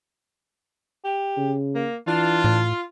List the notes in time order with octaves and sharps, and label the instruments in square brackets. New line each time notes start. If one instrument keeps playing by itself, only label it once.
[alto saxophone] G4
[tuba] C#3
[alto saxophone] A#3
[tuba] E3 [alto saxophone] D4 [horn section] F4
[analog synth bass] A2